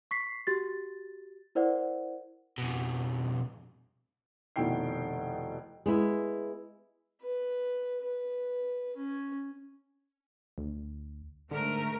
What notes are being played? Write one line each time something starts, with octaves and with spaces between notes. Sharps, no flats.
C#6 B6 C7
F#4 G4 A6
E4 A#4 C5 D5 F#5
F2 B2
F1 B2 D#3 E4 G5 C7
G#3 B3 E4
B4
B4
C#4
D2
G#2 D3 A3 A#4